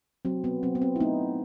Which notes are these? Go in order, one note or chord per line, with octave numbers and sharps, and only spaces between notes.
F#3 C4
B3
F#3 C4
B3
C4
E4
A3 B3 D#4